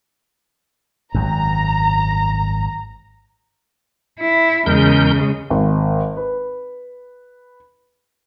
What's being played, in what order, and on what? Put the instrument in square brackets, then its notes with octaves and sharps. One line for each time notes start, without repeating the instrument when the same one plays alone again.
[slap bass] G#1 F#2 [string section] A#5
[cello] E4
[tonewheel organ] E2 A#4 G6 [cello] C#3 G#3
[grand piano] G#1
B4